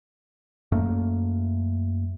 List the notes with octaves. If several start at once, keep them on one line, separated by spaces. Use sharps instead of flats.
F#2 A3 A#3